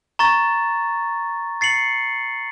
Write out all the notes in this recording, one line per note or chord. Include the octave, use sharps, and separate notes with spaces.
A#5 C#6 A6
A6 C7 C#7 F#7